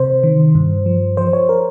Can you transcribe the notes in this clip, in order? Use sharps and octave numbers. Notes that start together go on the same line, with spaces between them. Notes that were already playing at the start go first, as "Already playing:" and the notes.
Already playing: C3 C5
D#3
G2
F3
F3 C5
C#5
A#4